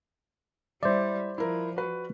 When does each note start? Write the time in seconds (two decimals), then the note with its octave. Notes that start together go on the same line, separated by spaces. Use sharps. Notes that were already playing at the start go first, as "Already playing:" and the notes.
0.83 G3 E4 C5 D5 E5
1.38 F3 E4 A#4
1.76 F#4 B4